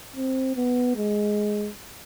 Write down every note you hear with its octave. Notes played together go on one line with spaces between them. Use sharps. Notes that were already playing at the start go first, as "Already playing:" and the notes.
C4
B3
G#3